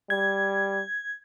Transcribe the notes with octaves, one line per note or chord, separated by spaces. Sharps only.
G3 G#6